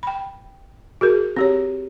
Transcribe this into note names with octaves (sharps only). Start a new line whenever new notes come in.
G5 B5
F#4 G#4 A#4
C4 G4 C#5